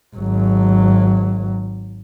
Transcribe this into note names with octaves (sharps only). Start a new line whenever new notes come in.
G#1 F#3